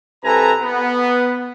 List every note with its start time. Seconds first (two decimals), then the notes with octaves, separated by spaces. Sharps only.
0.24 C2 C3 A4 B4 G#5 A#5
0.61 B3